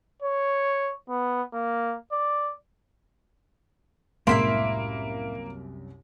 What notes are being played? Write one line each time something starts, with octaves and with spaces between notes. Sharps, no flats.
C#5
B3
A#3
D5
C2 F#2 A2 G#3 A#3 E4 E5 C6